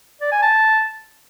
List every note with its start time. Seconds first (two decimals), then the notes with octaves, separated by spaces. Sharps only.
0.21 D5
0.32 G#5
0.42 A5